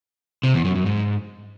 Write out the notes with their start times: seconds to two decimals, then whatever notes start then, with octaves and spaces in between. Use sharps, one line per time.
0.43 C3
0.54 E2
0.65 F#2
0.75 F#2
0.86 G#2